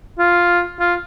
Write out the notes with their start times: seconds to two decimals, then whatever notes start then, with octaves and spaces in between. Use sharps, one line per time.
0.19 F4
0.80 F4